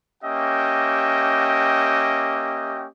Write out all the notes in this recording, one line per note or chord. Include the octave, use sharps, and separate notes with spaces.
A#3 C#4 G4 D#5 E5 G5